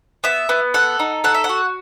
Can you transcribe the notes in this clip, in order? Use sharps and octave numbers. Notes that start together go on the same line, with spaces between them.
B3 E5
B3
A4 F#5
D#4
A4 F#5
E5
F#5
F#4